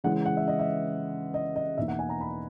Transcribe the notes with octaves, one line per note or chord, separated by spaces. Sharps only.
C#3 E3 G#3 C#4 F#5
F#5
E5
D#5
E5
D#5
D#5
E2 B2 A#3 D#4 E5
F#5
G#5
A#5
B5